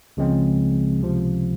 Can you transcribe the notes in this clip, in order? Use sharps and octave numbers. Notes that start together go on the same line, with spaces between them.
C#2 C#3 F3 G#3 C4
C#2 C3 F3